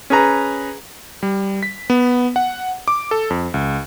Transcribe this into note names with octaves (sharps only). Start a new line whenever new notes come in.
C#4 G#4 B4 A#5
G3
B6
B3
F#5
D6
A4
F2
C#2